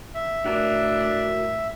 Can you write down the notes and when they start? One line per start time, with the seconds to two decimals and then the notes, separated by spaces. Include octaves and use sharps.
0.15 E5
0.46 A2 D4 F#4 A#4